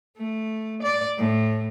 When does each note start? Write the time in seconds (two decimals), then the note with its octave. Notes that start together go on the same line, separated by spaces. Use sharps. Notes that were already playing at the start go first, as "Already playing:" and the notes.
0.17 A3
0.83 D5
1.17 A2